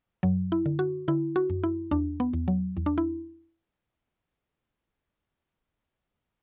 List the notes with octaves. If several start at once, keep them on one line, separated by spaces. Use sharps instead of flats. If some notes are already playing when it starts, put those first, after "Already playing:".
F#2 F#3
E4
D3
F#4
D3 E4
F#4
F#2
E4
E2 D4
B3
E2
F#3
E2
D4
E4